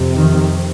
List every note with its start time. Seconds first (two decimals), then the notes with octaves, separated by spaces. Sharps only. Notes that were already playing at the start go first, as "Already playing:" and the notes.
Already playing: F2 C3
0.16 D#3